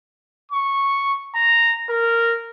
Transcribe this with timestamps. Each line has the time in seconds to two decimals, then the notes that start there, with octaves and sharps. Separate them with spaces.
0.51 C#6
1.35 A#5
1.90 A#4